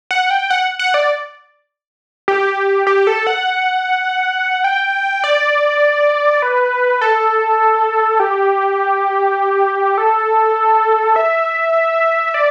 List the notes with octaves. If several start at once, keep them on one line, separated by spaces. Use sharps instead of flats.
F#5
G5
F#5
F#5
D5
G4
G4
A4
F#5
G5
D5
B4
A4
G4
A4
E5
D5